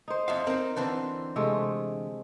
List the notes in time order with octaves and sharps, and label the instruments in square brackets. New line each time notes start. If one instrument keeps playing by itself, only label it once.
[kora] D#4 C5
[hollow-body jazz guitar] F2 E5 F5
[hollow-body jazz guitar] C4 D#4 [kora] A#4
[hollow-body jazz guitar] D3 E3 C4 [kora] C5
[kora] C3 G#3 A3